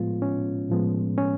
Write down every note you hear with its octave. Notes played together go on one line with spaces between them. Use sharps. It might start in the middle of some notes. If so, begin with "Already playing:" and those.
Already playing: A2 F3 G#3 B3 F4
C#4
A2 F3 G#3 B3
C#4